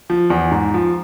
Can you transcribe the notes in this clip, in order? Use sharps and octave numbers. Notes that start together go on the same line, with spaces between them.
F3
E2
G#2
F3